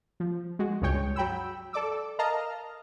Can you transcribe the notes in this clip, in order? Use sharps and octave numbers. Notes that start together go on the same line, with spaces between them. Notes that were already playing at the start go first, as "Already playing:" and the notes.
F3
G#3 F#4
C#2 G2 G#3 C#5 G5 C#6
F#3 G5 B5 E6
A4 D5 D6 E6
A#4 D#5 F5 A5 A#5 F6